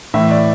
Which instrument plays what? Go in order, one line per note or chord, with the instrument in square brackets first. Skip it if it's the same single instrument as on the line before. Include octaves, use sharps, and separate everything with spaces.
[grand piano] A2 E3 A3 E5
D5